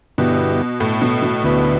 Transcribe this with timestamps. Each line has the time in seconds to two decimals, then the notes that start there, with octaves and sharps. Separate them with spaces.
0.18 G2 B2 D3 B3 E4 G4
0.80 A2
1.02 B2
1.22 B2
1.43 D2 D3 B3 E4 B4